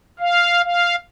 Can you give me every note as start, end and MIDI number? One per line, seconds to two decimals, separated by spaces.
0.20 0.62 77
0.64 0.96 77